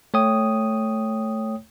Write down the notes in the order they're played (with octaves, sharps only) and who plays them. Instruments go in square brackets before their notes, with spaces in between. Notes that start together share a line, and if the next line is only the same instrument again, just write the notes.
[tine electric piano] A3 C#5 G5 D#6